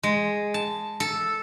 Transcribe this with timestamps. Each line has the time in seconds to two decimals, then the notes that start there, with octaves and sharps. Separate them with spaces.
0.03 G#3
0.54 A5
1.00 A4